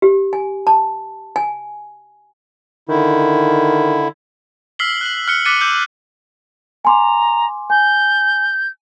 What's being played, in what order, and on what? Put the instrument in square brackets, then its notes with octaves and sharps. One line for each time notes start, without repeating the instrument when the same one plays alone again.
[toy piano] G4
G#5
A5
G#5
[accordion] D3 E4 [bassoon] D#3
[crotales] E6 F6 B6 C7 F#7 G7
F#6 F#7
F6 F#6 C#7 G7
D6 F#6 A6 B6 C#7 D#7
D6 E6 G6 D#7 F#7
[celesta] G#5 C6 D6 [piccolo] A#5
[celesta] G#5 [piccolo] G6